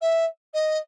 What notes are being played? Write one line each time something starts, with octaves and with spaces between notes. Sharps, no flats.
E5
D#5